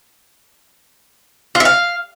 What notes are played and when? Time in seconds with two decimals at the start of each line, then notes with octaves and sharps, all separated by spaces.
1.55 F4
1.60 E5
1.65 F5